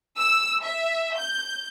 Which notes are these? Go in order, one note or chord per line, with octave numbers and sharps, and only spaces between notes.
E6
E5
G6